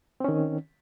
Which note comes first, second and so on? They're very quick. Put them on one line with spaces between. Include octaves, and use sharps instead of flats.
C4 C#4 D#3